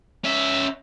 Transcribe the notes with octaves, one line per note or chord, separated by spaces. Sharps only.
C#4 E5